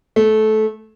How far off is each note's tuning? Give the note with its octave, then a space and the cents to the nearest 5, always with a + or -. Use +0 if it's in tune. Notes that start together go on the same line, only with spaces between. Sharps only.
A3 -20